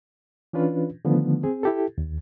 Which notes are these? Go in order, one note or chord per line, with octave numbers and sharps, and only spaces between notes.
E3 C#4 D4 F4 B4
D3 D#3 F3 A3 B3
C4 G#4
E4 G4 A4
D#2